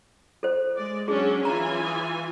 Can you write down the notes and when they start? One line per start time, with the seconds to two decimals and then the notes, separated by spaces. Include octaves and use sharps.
0.43 A4 C5
0.77 G#3 D5
1.08 F#3 C#4 D4 G#4
1.45 E3 F4 G#5 A#5
1.85 D#6